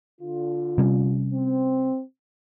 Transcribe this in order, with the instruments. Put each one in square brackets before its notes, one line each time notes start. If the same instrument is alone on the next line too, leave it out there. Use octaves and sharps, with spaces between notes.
[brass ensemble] D3 F4
[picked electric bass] C3 G3 C#4
[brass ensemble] C4